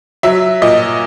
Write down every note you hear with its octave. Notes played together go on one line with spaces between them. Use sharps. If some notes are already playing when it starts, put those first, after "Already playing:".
F#3 E5
A#2 D#5